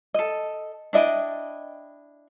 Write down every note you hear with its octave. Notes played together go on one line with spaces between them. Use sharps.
A4 D#5
D4 E4 D#5 G5